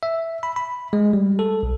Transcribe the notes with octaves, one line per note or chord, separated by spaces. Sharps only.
E5
B5
B5
G#3
G3
A4
B1